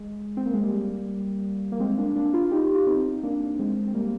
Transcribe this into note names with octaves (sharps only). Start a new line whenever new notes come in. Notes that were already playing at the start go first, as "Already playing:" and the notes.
Already playing: G#3
C4
A#3
G#3
G3 A#3
A#3
G#3 C4
A#3 D4
A#3 D4
D4 F4
D#4 G4
F4
C4 D#4
A#3 D4
G#3 C4
C4
G3 A#3